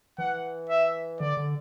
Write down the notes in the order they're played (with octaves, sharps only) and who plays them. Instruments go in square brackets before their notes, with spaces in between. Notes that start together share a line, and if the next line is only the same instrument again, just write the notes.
[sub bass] E3 [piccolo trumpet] F#5
[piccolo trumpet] E5
[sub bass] D3 [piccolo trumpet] D5
[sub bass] D3